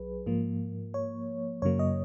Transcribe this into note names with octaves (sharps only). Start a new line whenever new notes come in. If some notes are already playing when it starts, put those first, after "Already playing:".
Already playing: B1 F#3 G#4 B4
G#2 F3 A#3
C#5
F#2 C#3 F#3 A#3 C#5
D#5